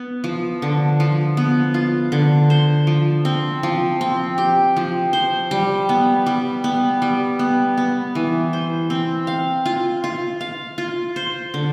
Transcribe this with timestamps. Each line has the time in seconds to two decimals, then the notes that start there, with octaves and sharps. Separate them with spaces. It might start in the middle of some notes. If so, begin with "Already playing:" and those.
Already playing: B3
0.24 F3
0.62 D3
1.00 F3
1.37 B3
1.74 F4
2.12 D3
2.50 C5
2.87 F3
3.25 C4
3.63 F3
4.01 C4
4.38 G4
4.77 F3
5.13 C5
5.51 G3
5.89 B3
6.26 G3
6.64 B3
7.02 G3
7.39 B3
7.77 B3
8.15 E3
8.53 C5
8.90 C4
9.27 F5
9.66 F4
10.04 F4
10.41 F5
10.78 F4
11.16 C5
11.54 D3